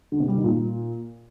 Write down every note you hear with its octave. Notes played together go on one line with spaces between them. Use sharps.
D3
C3
G3
D#3
A#2